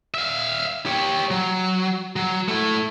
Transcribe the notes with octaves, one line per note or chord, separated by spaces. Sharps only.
E5 F5
G4 C#5
F#3
F#3
A3 E4